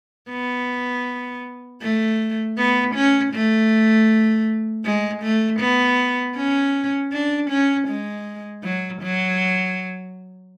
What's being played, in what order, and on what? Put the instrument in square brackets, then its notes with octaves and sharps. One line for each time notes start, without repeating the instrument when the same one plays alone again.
[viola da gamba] B3
A3
B3
C#4
A3
G#3
A3
B3
C#4
D4
C#4
G#3
F#3
F#3